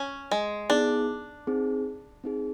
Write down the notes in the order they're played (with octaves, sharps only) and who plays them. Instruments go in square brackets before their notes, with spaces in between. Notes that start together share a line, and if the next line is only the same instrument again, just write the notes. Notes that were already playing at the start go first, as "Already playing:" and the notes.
Already playing: [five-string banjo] C#4
G#3
[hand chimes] B3 D#4 G#4 [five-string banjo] D4
[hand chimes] C4 D#4 G#4
C4 D#4 G#4